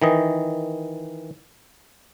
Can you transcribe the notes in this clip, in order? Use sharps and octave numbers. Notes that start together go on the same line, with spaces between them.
D#3 E3 D#5